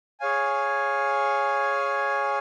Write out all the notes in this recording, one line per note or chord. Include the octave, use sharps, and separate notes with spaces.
G#4 C#5 F5 G#5